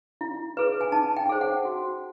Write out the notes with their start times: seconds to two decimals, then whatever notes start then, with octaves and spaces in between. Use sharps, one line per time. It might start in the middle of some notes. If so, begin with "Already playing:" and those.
0.21 E4
0.57 G#4 B4
0.81 G#5
0.92 D#4 A5
1.17 G5
1.29 G#4 C5
1.41 F#5
1.65 F#4